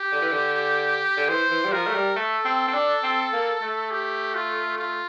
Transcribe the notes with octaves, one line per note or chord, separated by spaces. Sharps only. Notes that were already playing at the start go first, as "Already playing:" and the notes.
Already playing: G4
D3
E3
D3
D3
E3 C5
E3
G3
F3 A#4
A3
G3
A3 A4
C4
C4
D4
C4
A#3
A3
G4
F4
F4